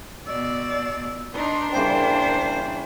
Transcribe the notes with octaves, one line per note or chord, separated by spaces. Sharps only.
B2 D5 D#5 E6
D4 D#4 B4 D5 A#5 C6
C#3 E3 G3 A#3 C5